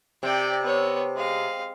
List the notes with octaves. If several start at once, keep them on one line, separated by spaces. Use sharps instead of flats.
C3 D5 G5
B3 C#5
G#3 F5